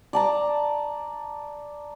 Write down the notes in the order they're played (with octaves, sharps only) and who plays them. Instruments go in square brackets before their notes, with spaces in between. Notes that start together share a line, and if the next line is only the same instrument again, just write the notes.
[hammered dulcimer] D5 A5 A#5